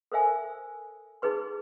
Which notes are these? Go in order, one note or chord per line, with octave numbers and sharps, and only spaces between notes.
A4 A#4 C5 E5 G#5
D#4 G#4 B4 C6